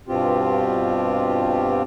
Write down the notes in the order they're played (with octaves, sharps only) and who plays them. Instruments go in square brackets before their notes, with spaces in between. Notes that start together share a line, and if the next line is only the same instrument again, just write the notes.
[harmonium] G2 B2 C4 F4 G4